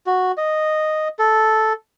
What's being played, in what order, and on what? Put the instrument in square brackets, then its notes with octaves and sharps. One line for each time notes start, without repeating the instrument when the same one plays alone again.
[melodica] F#4
D#5
A4